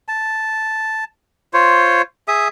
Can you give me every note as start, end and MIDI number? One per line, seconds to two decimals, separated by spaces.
0.08 1.04 81
1.54 2.02 65
1.54 2.02 72
1.54 2.02 73
2.28 2.48 68
2.28 2.48 76
2.28 2.48 87